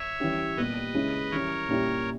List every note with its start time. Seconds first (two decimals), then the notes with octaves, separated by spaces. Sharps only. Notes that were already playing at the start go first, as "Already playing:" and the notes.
Already playing: C#5 E5
0.20 E3 G3 C#4 G4
0.57 A#2 G3 B3 G4 B4 D#5
0.94 C#3 G#3 C#4 E4
1.31 E3 G3 C#4 A#4 C#5
1.69 A#2 G3 C#4 E4 G4